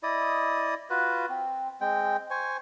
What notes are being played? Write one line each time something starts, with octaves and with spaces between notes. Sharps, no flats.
E4 D5 D#5 D#6
F4 F#4 B4
C4
G#3 C4 G5
C5 G#5 C#6